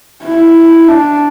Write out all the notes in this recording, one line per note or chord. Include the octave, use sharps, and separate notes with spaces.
E4
D4